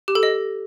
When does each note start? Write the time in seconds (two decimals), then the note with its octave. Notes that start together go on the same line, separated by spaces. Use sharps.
0.08 G4
0.15 A4
0.23 D#5